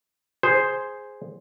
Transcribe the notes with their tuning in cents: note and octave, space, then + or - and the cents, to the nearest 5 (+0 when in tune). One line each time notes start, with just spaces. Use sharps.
G#4 +0 C5 +0